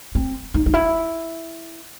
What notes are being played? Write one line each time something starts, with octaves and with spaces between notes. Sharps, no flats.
C4
D#4
D#4
E4